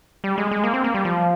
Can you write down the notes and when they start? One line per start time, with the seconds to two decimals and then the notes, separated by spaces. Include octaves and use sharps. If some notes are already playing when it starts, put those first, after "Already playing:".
0.24 G3
0.38 G#3
0.51 G#3
0.64 A#3
0.74 C4
0.84 A#3
0.94 G3
1.05 F3